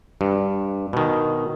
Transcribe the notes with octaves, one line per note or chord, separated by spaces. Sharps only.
G2
B2 D#3